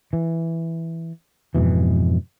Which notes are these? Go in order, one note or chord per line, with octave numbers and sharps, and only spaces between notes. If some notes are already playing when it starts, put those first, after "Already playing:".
E3
F2 G#2 B2 E3